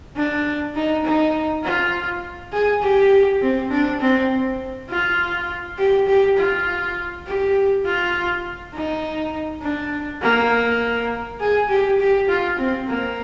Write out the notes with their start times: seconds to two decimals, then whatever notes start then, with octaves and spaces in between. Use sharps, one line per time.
0.16 D4
0.75 D#4
1.05 D#4
1.64 F4
2.53 G#4
2.83 G4
3.42 C4
3.71 D4
4.01 C4
4.89 F4
5.79 G4
6.08 G4
6.37 F4
7.26 G4
7.86 F4
8.75 D#4
9.63 D4
10.22 A#3
11.40 G#4
11.69 G4
12.00 G4
12.29 F4
12.58 C4
12.88 A#3